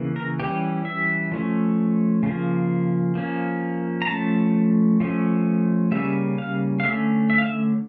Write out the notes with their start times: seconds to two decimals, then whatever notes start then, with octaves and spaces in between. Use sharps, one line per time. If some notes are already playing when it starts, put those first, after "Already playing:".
Already playing: C#3 E3 A#3
0.16 A#4
0.40 E3 G3 C#4 G4
0.85 E5
1.32 F3 A3 C#4
2.23 C#3 F3 A#3
3.15 F3 A#3 C#4
4.02 A#5
4.07 F3 A3 C#4 A5
5.00 F3 A3 C#4
5.91 C#3 G3 A#3 C#4 E5
6.38 F5
6.80 F5
6.84 D3 A3 C#4 E5
7.30 E5
7.38 F5
7.46 E5